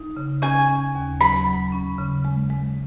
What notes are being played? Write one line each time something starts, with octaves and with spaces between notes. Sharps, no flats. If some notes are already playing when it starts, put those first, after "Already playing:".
Already playing: D#4
C#3
C#4 G#5
C#4
D#2
F#3 B5
F#3
C#4
C#3
G#3
G#3